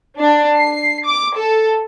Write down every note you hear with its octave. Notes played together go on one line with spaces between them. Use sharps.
D4
C7
D6
A4